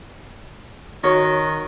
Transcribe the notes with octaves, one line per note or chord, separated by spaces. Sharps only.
D#3 F#4 C#5